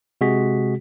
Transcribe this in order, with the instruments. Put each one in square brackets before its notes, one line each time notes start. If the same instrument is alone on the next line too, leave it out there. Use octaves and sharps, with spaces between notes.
[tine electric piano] C3 G#3 F#4 G#4 B6